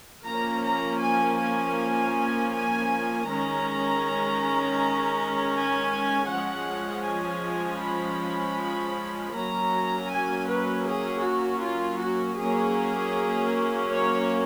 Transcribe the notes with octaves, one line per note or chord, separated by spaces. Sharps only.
F3 A#3 C#4 A#5
A#5
G#5
G#5
G#5
D#3 G#3 C#4 A#5
G#5
F3 G#3 C#4 F#5
G#5
B5
F#3 A#3 C#4 A#5
G#5
B4
G#4
F#4
F4
F#4
F#3 A#3 C#4 G#4
C#5